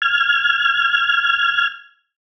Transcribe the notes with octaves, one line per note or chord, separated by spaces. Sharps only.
F6 G#6